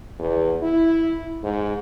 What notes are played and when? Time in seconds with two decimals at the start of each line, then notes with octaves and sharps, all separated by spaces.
0.19 E2
0.62 E4
1.43 G#2